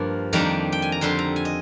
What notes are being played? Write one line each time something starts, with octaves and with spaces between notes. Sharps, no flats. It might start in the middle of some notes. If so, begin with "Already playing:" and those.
Already playing: G2 F3 A#3
F2 D#3 G3 A#3 D4 A#5
G5
G#5
A#5
F2 D3 G3 C4 C6
A#5
G#5
D#5